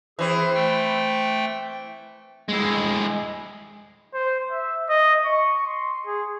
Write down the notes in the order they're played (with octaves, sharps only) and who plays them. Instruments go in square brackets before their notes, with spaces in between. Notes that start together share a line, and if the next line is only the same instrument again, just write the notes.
[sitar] E3 C4 [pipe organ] G#4
[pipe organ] A3 G5
[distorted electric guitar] G#3 E4
[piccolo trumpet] C5
E5
D#5
C#6
C6
G#4